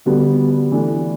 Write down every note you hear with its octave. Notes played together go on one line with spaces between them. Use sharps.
D3 G3 B3 F#4
E3 A3 D4